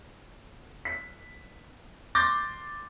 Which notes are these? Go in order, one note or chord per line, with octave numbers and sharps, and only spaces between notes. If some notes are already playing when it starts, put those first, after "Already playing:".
B6
C6 D6 G6 A6 A#6